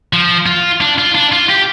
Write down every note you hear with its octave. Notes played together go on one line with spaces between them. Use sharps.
F3
F4
D4
F4
D4
F4
G4